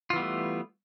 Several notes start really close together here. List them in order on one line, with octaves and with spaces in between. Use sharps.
F4 E3 B3 G3 A3